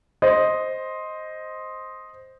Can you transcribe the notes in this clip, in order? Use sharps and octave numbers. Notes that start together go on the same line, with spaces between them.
C5 D#5